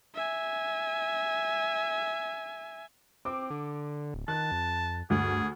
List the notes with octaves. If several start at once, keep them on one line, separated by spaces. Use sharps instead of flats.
E5 G#5
C4 D6
D3
D1
D#3 A5 F#6
F2
D2 G2 G#4